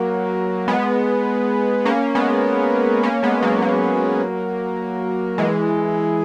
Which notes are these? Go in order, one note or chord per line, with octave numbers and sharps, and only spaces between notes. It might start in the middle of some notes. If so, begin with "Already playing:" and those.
Already playing: F#3 A#3
G#3 B3
A#3 C#4
G#3 B3
A#3 C#4
G#3 B3
F#3 A#3
F#3 A#3
E3 G#3